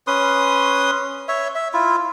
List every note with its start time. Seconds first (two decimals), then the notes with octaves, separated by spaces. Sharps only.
0.07 C#4 B4 C6 D#6
1.28 C#5 E5
1.55 E5
1.73 E4 F4